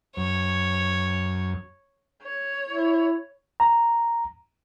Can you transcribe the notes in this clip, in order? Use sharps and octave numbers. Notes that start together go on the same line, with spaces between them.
F#2 C#5
C#5
E4
A#5